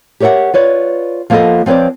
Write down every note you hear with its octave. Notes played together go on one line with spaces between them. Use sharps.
G4 A#4 C#5 D5 E5 F#5
F4 B4 C#5 D5
F3 A#3 B3 F4 A4 D#5
F3 C4 B4 C#5 D5